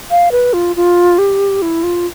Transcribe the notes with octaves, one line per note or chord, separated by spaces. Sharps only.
F5
B4
F4
F4
G4
E4
F4